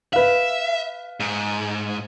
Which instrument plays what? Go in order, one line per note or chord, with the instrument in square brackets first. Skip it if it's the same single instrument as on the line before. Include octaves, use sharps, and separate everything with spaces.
[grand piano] B4 F5 [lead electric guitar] E5
[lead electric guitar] G#2